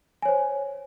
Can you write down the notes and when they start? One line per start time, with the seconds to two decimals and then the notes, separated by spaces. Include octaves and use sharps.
0.22 G#5
0.25 C#5
0.28 C5